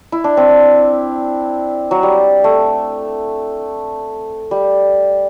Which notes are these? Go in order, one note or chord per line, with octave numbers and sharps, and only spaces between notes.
E4
D4
C4
F#3
G3
A3
G3